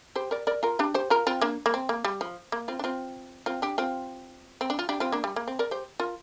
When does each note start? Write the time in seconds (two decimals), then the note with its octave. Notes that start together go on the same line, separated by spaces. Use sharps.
0.16 G4 C5
0.31 A#4 D5
0.47 A#4 D5
0.63 F4 A#4
0.79 D4 G4
0.94 G4 C5
1.10 F4 A#4
1.27 C4 F4
1.41 A#3 D4
1.66 A#3
1.74 C4
1.89 A#3
2.04 G3
2.21 F3
2.52 A#3
2.68 C4 F4
2.79 D4
2.84 C4 F4
3.46 C4 F4
3.62 D4 G4
3.78 C4 F4
4.61 C4
4.70 D4
4.79 F4
4.89 D4 G4
5.00 C4 F4
5.12 A#3 D4
5.24 G3
5.36 A#3
5.48 C4
5.59 A#4 D5
5.71 G4 C5
6.00 F4 A#4